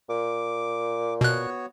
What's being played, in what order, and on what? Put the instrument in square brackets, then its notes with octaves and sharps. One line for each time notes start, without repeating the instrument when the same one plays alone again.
[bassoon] A#2 [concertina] D6
[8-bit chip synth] B2 F#6 [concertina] B3 F#4 C#5